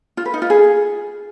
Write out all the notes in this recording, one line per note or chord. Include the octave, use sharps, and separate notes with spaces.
F4
B4
D#4
F4
G#4